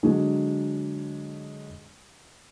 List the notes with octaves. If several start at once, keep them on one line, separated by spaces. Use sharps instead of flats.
D3 F#3 G#3 D4